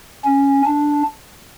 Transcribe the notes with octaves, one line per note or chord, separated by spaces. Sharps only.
C#4
D4